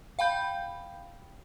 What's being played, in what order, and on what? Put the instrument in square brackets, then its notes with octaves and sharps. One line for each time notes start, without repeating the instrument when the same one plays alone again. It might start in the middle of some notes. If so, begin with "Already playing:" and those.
[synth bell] F5 G5 B5 G6